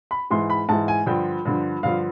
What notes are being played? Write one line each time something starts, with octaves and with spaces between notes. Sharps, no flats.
B5
G#2 E3 C6
B5
G#2 E3 A5
G#5
G2 D3 F3 G5
G2 D3 F3
G2 D3 F3 F5